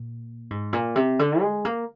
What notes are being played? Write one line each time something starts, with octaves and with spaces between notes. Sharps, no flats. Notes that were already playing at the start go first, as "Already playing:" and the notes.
Already playing: A#2
G#2
A#2
C3
D3
G#3
A#3